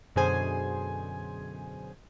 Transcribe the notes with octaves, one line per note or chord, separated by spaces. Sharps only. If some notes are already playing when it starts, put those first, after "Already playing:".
F#2 B2 D3 G#4 C5 G#5